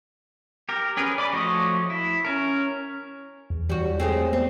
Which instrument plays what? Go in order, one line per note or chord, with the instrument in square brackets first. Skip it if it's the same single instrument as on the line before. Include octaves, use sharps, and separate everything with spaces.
[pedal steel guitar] G4 A#4
C#4 G#4 A#4 B4
D5 B5 D6
F3 A3 F#4 C#5 D#5
E4
C#4 A#4
[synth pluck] E2
[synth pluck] F#2 A#2 E3 [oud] G3 F#4
[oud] G#3 A3 C4
[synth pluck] B3 C5 D5 [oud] C4